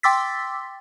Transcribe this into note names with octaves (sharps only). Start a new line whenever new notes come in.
G5 C6 D6 E6 A6 B6